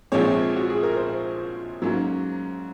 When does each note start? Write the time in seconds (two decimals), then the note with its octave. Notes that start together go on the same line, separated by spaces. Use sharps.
0.12 A#1 A#2 F3 G#3 C4 C#5
0.56 F#4
0.70 G#4
0.83 A#4
0.96 C5
1.82 G#2 F#3 A#3 C#4